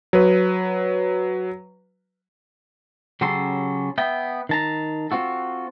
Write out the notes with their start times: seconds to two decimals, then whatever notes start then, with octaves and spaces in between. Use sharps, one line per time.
0.13 F#3 B4
3.21 C#3 F#3 C#4 G4 A4 C6
3.98 B3 E5 G5
4.49 D#3 A5 A#5
5.11 C4 F4 F#4 A4